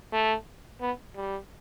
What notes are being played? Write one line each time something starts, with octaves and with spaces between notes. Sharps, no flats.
A3
B3
G3